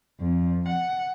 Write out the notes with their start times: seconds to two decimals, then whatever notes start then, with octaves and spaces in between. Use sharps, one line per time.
0.20 F2
0.68 F#5